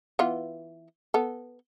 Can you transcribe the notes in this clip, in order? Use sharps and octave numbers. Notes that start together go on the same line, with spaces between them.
E3 B3 F4
B3 A4